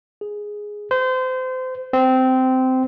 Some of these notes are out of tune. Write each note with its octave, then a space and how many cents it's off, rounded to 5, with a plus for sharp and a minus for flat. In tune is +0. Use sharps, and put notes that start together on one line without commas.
G#4 +0
C5 -30
C4 -15